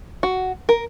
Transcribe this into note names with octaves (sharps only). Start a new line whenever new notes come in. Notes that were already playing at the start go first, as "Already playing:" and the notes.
F#4
A#4